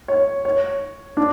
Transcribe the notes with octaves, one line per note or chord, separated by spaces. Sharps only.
C#5
C#5
D4